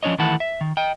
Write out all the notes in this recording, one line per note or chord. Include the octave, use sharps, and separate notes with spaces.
F3 C#4 D4 C#5 D#5
D#3 E3 A3 E4 F#5 A5
E5
D#3
D#5 G5